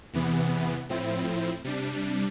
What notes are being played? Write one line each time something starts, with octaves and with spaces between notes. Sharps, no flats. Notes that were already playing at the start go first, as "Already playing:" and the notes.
E2 C3 E3 B3
A2 F3 C4 E4
C3 G3 D4